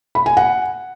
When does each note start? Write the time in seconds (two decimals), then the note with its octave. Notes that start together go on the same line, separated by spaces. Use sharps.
0.15 B5
0.26 G#5
0.37 F#5